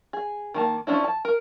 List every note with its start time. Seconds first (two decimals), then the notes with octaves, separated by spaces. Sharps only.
0.13 G#4
0.54 D#3 A#3 A5
0.87 F3 C#4 D4 E4
1.04 A5
1.25 A#4